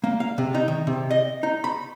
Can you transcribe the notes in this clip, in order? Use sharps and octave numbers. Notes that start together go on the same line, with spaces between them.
A#3
F5
C3
D#4
D#3
C3
D#5
D#4
B5